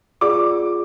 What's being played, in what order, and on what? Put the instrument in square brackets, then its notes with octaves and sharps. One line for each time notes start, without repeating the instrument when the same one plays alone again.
[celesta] F4 G#4 D5 [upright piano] D6